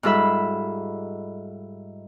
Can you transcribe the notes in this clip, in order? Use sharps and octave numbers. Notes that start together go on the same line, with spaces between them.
G#2 G3 F4 A4 E5 B5